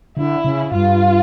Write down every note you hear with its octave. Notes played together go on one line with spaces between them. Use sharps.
D3 E4
C#3
G2 F4